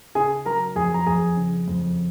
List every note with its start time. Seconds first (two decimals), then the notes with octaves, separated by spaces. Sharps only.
0.15 C#3 G#4 G#5
0.45 F#3 A#4 A#5
0.76 F2 G#4 G#5
0.94 A#5
1.06 F2 G#4 G#5
1.37 C#3
1.68 F2